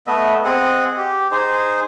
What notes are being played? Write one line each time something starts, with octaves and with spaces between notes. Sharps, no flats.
A3 B3 D#5 E5
C4 G#4 D#5 F#5
G4
D#4 G#4 C5